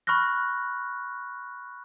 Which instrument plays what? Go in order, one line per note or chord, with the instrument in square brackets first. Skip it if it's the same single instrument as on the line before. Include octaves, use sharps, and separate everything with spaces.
[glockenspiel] B5 C#6 F6 F#6 A#6